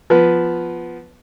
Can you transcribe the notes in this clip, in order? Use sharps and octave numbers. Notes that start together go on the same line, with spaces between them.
F3 B3 B4